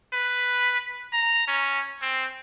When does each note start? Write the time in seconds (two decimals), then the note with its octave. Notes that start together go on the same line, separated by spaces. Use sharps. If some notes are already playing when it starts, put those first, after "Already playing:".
0.13 B4
1.13 A#5
1.48 C#4
2.02 C4